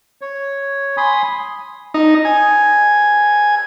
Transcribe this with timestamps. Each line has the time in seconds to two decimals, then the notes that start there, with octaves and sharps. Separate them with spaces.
0.21 C#5
0.97 G#5 B5 C6 D#6
1.94 D#4
2.25 G#5